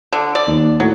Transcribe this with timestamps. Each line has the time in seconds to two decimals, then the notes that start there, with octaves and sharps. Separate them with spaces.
0.12 D3
0.35 D5
0.47 D#2
0.80 A2 F#3